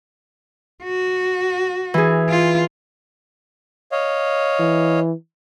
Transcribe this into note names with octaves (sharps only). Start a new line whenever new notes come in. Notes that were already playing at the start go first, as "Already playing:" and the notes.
F#4
E3 G#4
F4
C#5 D#5 F5
E3